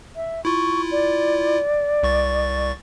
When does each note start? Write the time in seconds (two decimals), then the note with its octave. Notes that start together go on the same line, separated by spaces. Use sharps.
0.16 E5
0.45 E4 F4 C#6
0.91 D5
2.03 C2 C#6 A6